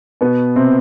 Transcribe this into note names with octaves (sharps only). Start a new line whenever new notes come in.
B2 B3
C3 C4